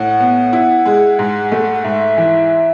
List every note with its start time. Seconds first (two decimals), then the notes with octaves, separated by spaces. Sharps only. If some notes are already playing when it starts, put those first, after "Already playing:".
Already playing: A2 F#5
0.20 B3
0.53 E4
0.85 G#3
1.19 G#2
1.52 A3
1.84 G#2 E5
2.17 E3